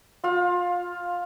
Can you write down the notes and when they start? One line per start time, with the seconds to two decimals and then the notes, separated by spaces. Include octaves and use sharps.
0.24 F4 F5